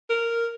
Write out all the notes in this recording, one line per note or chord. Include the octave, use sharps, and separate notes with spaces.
A#4